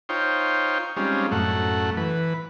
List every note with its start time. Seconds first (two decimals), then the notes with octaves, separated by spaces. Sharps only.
0.09 D#4 F4 C5 C#5 G5
0.97 G3 G#3 C4 C#4 D#4 F4
1.32 F#2 A2 A3 F#5
1.97 E3 B4